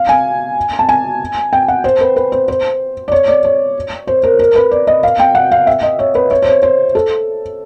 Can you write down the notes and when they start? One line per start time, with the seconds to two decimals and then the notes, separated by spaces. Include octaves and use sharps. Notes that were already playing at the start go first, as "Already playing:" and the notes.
Already playing: F5
0.09 G#5
0.79 A5
0.89 G#5
1.53 G5
1.68 F#5
1.84 C5
2.01 B4
2.16 B4
2.32 C5
2.48 C5
3.08 D5
3.12 C#5
3.28 D5
3.44 C#5
4.07 C5
4.23 A#4
4.39 A#4
4.56 B4
4.71 D5
4.87 D#5
5.03 F5
5.20 G5
5.35 F#5
5.51 F5
5.67 E5
5.83 D#5
5.99 C#5
6.15 B4
6.31 C#5
6.42 C5
6.47 C#5
6.63 C5
6.95 A4